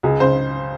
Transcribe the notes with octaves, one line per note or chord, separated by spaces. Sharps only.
C#2 G#4
C#3 C5